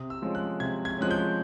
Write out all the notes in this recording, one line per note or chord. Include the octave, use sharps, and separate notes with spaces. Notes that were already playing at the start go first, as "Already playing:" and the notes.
Already playing: C3 D#6
E6
F3 G#3 C#4
F#6
C3 G#6
G#6
F3 G#3 C#4 F#6
G6